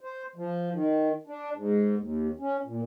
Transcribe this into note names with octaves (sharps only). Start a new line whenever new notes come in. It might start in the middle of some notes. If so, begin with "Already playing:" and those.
C5
F3
D#3
D4
G#2
D#2
C#4
A#2